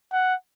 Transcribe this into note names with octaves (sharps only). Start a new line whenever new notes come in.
F#5